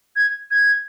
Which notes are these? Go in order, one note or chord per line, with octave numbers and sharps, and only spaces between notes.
G#6
G#6